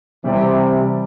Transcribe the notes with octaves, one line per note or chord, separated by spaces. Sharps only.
C3 E3 G3 C4 G4 D5